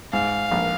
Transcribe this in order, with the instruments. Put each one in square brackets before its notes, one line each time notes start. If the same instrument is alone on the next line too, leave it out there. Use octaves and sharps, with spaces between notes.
[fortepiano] G#2 [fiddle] F5
[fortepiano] A#1